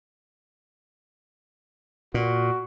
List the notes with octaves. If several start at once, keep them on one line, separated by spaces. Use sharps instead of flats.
A#2 F#4